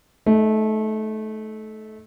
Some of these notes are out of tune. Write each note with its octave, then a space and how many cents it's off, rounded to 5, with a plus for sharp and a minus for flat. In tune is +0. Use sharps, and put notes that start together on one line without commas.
A3 -20 D#4 +10